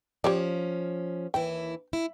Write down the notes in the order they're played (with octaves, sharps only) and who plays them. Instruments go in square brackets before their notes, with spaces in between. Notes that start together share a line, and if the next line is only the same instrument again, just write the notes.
[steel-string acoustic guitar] F3 C#4 [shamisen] G4 C#5 D5
[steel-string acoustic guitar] D#2 E3 E4 [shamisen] G5
[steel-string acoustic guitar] E4